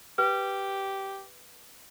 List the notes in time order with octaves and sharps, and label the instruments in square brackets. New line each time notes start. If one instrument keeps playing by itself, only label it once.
[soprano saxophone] G4 [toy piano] B4